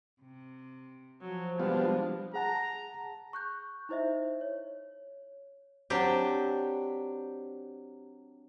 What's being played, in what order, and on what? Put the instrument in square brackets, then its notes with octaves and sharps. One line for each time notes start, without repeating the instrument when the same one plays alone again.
[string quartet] C3
[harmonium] F3 [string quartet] F#3
[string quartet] C3 G#3 D4 [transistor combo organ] G3 B3 F4
[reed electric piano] G#4 F#5 A5 [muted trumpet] A#5
[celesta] C#6 F#6 G6
D#4 E4 C5 D#5 E5
C#5
[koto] F#3 C4 D4 G4